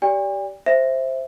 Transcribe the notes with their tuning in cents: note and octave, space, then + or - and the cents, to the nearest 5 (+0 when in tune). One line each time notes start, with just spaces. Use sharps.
G4 -15 D5 -20 G5 +45
C5 +5 E5 +0